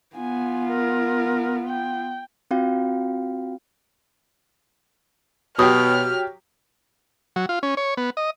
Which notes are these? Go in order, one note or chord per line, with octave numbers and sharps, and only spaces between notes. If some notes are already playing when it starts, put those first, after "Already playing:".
B3 F4 G#5
A#4
G5
C4 F4 F#4 F5 G5
B2 F#3 G4 D#6 F6
F#3
F4
C#4
C#5
B3
D#5